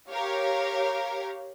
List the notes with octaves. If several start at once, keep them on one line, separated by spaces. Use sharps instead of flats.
G4 A#4 C#5 F5